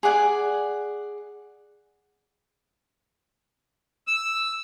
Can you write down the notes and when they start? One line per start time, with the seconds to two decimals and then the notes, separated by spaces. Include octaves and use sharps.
0.03 G#4 D5 F#5 G#5
4.08 E6